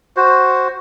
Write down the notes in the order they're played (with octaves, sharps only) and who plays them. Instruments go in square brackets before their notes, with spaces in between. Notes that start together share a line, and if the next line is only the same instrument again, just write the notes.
[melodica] F#4 C5